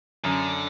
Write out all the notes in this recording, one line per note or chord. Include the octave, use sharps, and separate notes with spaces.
F#2 D3